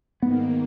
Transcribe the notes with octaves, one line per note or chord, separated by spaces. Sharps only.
G#2 D#3 A#3 B3